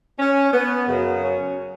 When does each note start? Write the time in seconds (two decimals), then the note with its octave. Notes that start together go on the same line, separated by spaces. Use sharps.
0.19 C#4
0.53 B3
0.87 F#2 C#3 F#3
1.21 C#4